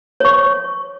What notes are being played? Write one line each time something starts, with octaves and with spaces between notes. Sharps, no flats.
C#5 C#6